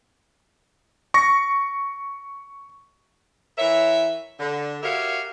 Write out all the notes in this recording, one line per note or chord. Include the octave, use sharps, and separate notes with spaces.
C#6 A#6
E3 A#4 C#5 E5
D3
F#4 G4 A#4 C#5 E5 F5